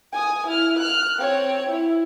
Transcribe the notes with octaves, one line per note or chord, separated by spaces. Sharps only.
G#5 D#6
E4 F6
F6 F#6
C4 C#5
E4